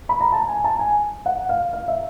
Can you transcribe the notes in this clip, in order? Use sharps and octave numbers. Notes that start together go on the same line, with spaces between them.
B5
A#5
A5
G#5
A5
G#5
F#5
F5
F5
E5